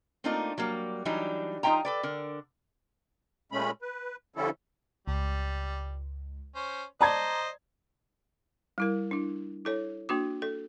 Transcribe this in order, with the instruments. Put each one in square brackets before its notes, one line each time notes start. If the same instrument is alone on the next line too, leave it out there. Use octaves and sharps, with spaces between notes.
[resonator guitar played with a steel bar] A3 A#3 C4 D4 D#4 F4
F#3 G3 A#3
E3 F#3 G3 D4 D#4
F3 D#4 F4 E5 G5 A#5
A4 B4 D5
D3 A#4
[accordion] A#2 G#3 A3 C#4 B5
B4
D3 F3 G3 C#4 E4 A4
[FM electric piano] C#2 [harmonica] G3
[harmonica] C#4 C5
[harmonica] C5 D#5 [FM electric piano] D5 [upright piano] A5 A#5 G#6
[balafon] G3 E4 A#4
D4 E4
E4 A4 C#5
A#3 D4 F#4 D6
A4